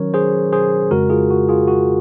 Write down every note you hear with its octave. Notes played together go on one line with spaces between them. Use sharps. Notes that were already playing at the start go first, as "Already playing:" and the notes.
Already playing: D#3 F#3 C#4 A#4 C#5
G#4 C5
G#4 C5
F2 C#3 G#3 F#4 A#4
F4 G#4
F#4
F4 G#4
F#4